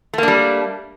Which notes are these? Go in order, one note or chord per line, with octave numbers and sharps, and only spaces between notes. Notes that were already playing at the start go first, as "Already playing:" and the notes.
G3 A3 A#3 D4